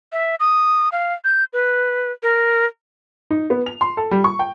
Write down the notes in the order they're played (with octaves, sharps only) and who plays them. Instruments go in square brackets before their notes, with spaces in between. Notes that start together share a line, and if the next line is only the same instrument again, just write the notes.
[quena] E5
D#6
F5
G6
B4
A#4
[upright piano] D#4
B3
F7
C6
A4
G3
C#6
G5